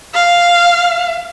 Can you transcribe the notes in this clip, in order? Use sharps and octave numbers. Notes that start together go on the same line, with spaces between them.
F5